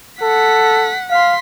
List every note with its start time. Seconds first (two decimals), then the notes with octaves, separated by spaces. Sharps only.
0.22 A4 F#5 B6
1.10 F5 C6 B6